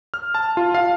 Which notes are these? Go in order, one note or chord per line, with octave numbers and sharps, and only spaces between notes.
F6
A5
F4
F5